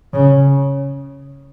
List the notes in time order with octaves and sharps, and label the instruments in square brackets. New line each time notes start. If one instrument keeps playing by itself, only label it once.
[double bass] C#3